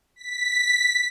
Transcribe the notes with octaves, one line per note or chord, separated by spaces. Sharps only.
B6